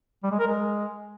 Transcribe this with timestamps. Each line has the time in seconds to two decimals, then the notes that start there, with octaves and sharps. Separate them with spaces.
0.23 G3
0.31 G#3
0.39 A#4
0.47 G#3